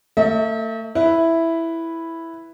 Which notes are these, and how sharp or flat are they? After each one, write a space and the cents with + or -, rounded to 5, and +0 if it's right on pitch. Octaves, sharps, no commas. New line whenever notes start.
A3 +35 E5 -45
E4 +0 B4 +0